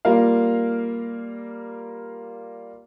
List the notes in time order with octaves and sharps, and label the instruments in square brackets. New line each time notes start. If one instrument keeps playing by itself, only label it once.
[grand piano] G3 A#3 F4 A#4 F5